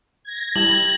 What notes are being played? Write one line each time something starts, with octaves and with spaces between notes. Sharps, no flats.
G#6 A#6
G3 E4 A5 F#7